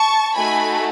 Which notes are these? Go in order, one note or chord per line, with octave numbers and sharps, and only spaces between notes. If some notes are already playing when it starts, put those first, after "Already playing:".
Already playing: A5 C#6
A3 D#4 F#4 A4 G#5 B5